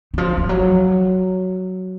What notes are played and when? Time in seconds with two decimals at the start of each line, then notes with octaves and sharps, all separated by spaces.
0.14 D#3
0.18 F3
0.38 F3
0.49 F#3